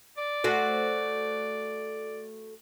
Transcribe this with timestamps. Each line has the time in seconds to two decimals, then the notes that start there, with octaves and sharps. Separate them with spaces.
0.17 D5
0.44 A3 F#4 C5